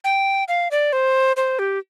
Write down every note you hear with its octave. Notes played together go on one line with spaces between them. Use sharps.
G5
F5
D5
C5
C5
G4